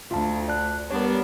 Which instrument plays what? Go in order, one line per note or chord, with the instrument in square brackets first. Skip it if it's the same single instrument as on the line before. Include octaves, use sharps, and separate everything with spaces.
[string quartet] D2 [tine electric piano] F4 F5 A5
[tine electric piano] D5 A5 F#6
[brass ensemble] G3 B3 [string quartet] D4 A#4 [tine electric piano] C#5